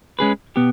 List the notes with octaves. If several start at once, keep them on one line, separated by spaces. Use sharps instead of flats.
G#3 C#4 G#4 B4
B2 B3 G4